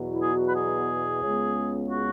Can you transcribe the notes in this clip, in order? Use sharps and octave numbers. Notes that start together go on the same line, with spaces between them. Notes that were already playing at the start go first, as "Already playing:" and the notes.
Already playing: E2 B2 F#3
E4
G#4
F#4
B4
G#4
C#2 C#3 G#3 B3
F#4